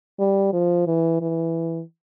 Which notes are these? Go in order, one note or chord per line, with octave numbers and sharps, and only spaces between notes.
G3
F3
E3
E3